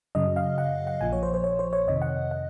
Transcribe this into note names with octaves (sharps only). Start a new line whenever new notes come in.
F#2 C#3 F#3 D#5
F5
F#5
F#5
A#1 A#2 F3 G#5
C#5
C5
C5
C#5
C5
C#5
F2 C3 D#3 D#5
F#5
F#5